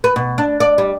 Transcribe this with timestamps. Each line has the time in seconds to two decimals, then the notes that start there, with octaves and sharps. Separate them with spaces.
0.04 B4
0.16 B2
0.38 D4
0.60 D5
0.78 G3